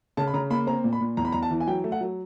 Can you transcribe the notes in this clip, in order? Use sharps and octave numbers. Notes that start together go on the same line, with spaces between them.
C#3 A5
B5
C#3 A#5
A#3 B5
C4 A#5
A#2
B5
A#2
E2 A#5
B5
E2 A#5
A5
E3
G#5
F#3 G5
A3
F#5
F#3